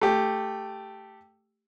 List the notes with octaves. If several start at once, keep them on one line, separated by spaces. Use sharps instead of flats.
A3 G4